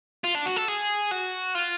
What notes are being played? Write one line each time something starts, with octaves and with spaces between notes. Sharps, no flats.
F4
D4
F#4
A4
G#4
F#4
F4